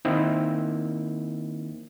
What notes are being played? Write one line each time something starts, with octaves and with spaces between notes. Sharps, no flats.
D#3 A#3 C4 D#4 E4 A#4